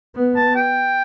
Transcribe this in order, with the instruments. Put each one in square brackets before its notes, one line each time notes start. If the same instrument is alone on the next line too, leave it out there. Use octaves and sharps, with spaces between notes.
[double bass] B3
[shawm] A5
G5